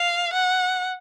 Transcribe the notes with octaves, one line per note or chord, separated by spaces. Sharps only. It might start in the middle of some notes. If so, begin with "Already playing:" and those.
Already playing: F5
F#5